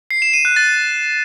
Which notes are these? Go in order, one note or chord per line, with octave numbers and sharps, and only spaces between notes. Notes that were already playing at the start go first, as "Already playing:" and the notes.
C7
E7
D#7
F#6
A6